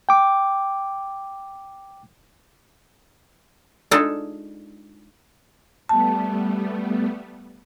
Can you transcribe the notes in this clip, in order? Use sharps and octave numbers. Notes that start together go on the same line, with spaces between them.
G5 D6
G#3 D4 D#4 F4 A4
G3 A3 B3 A5